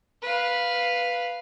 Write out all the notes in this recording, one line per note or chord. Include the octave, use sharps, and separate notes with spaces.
B4 F5